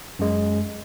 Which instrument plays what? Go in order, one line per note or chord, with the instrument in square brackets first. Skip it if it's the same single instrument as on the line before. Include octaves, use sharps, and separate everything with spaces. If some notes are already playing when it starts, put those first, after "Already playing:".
[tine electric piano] F#2 G#3